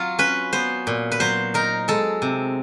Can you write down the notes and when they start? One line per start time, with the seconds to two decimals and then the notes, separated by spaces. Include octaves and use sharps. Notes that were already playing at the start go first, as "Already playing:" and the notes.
Already playing: F#3 F4
0.19 C#4 B4
0.53 B3 C5
0.87 A#2
1.12 B4
1.20 F#3 C5
1.54 D#4 A#4
1.88 G#3 A4
2.22 C3